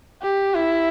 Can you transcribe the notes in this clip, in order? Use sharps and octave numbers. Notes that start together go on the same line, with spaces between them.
G4
E4